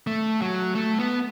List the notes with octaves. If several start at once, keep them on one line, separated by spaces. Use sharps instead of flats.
A3
F#3
A3
B3